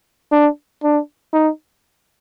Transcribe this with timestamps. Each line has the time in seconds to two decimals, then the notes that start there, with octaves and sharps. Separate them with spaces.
0.32 D4
0.83 D4
1.33 D#4